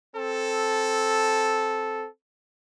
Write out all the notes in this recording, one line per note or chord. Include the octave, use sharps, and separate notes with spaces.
C4 A4